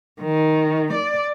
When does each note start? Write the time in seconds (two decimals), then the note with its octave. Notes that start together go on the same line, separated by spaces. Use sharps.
0.21 D#3
0.93 D5